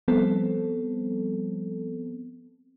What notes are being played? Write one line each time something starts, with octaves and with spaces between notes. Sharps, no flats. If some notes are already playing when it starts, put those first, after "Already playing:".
F3 G3 B3 C4 A4